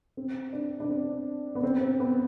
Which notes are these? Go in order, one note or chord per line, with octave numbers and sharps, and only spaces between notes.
C4
D4
D4
C4
B3
C4
C4
B3